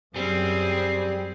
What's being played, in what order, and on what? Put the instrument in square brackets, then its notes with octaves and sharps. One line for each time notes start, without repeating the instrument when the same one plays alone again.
[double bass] F#2 [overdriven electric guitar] G3 [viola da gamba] C4 G#4